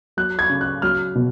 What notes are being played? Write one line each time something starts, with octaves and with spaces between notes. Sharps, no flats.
F#3 F#6
G#6
C#3
F#6
F#3 F6
B2